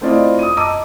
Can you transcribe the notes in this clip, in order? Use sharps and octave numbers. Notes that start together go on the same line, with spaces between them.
A3 C4 E4 F4 D5 D#5
D#6 D#7
D#5 A5 A#5 D6 E6 D#7